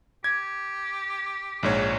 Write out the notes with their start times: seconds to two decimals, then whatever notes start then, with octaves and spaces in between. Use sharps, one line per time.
0.24 G4 G#6
1.63 A#1 G#2 C#5